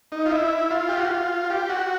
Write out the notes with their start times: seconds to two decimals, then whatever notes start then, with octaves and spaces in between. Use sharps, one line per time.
0.12 D#4
0.26 F4
0.31 E4
0.71 F4
0.89 G4
0.99 F#4
1.11 F4
1.50 G4
1.69 F#4